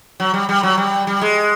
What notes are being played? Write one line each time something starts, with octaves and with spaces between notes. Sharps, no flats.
F#3
G3
G3
F#3
G3
G3
G#3